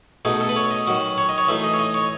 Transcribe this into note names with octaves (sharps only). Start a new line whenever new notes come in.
B2 A3 D#4 G#4
A4
B4
C#5
D#5
D#3 F#3 C#4
C#5
D#5
C#5
E3 A3 D#4 E5
D#5
C#5
D#5
C#5